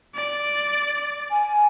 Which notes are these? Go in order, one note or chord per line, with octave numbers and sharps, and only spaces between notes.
D5
G#5